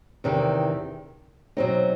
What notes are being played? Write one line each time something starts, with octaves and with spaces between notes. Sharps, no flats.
E2 C3 D#3
B2 F#3 C4 D#4